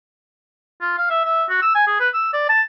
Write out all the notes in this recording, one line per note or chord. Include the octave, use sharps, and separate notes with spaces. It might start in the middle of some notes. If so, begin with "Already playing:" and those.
F4
F5
E5
E5
F#4
E6
G#5
G#4
B4
E6
D5
A5